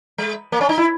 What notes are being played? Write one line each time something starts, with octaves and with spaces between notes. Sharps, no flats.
G#3
A#3
C#4
D#4
E4